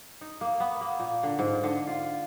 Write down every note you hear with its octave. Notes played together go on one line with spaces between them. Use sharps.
D#4
A#3
B3
A#3
A#2
D3
G#2
D3
F4